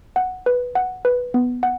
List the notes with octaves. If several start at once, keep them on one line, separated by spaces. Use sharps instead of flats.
F#5
B4
F#5
B4
B3
F#5